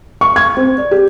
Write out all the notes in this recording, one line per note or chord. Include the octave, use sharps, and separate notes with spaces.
C#6
G#6
C4
D5
G4